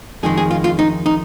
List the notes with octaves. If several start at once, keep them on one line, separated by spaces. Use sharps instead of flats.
F2 D#3 G#3 G#4
G#4
F4
F4
D#4
D#4